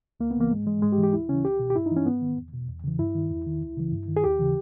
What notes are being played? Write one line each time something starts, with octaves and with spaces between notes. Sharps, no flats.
C#2 A#3
B3
C#3 E3 A#3
G#2 G#3
E3 G#3
G#2 G#3
G4
E3
G4
D#2 E4
C#3 E3 C#4
C#2 G4
B2
G4
G2 E4
E3 D#4
C#4
G#2 B3
D#3
E2
B2
E2
C#3 E3
G2 E4
D#3
E2
D#3
C#2
C#3 E3
G2
D#3
G#4
D#2 G4
C#3 E3